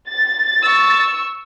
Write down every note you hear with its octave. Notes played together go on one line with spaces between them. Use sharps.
A6
C#6 E6